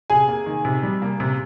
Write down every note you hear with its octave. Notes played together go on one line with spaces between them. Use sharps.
C3 G#4 G#5
A#3
D#3
C3
G3
A#3
C3